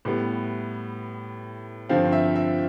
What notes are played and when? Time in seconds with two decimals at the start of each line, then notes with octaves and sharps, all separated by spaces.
0.05 A2 G3 B3
1.89 G2 D3 F3 C4 F5
2.12 E5
2.36 E5